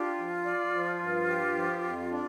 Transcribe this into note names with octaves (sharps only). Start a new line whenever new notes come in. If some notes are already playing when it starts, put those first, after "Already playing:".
Already playing: D4 F4 G4
F3
D5
F3
G2
G4
F3
F2
D4